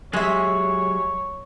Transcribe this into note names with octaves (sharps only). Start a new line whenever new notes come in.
F#3 G#3 G4 G#4 C#5 E5